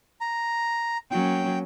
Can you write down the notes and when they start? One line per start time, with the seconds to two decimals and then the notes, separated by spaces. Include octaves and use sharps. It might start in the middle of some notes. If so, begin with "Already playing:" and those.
0.21 A#5
1.11 F#3 A#3 C#4 G5